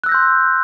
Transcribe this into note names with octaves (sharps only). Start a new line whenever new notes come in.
C6 E6 F#6 G6 A#6